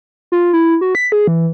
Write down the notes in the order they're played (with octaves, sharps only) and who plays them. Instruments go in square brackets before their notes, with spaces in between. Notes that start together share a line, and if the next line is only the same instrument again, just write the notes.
[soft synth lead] F4
E4
F#4
B6
G#4
E3